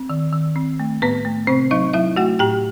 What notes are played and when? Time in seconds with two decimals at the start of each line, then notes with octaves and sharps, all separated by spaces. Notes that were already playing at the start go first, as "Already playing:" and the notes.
Already playing: C4
0.09 D#3
0.33 D#3
0.56 C4
0.80 A3
1.02 A2 B3 B4
1.25 A3
1.47 C3 C4 C5
1.71 F#3 D#4 D#5
1.93 F#3 E4 E5
2.16 A3 F#4 F#5
2.39 A2 G4 G5